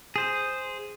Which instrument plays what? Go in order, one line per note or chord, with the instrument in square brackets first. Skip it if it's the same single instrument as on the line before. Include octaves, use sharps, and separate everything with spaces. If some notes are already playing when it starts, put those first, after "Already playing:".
[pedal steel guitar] G#4 C5